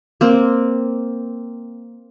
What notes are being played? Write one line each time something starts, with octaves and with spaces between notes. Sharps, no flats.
A#3 C4